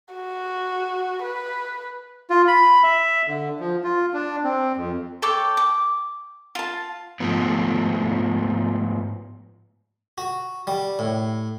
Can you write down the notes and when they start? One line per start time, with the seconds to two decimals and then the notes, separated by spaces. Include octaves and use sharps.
0.14 F#4
1.22 B4
2.30 F4
2.48 B5
2.83 E5
3.27 D3
3.60 F3
3.84 F4
4.14 D4
4.44 C4
4.77 F2
5.22 A4 C#5 G5 D6
5.57 D6
6.55 F4 A5
7.20 G#2 F3 A3 B3
10.18 F#4
10.67 G3
10.99 A2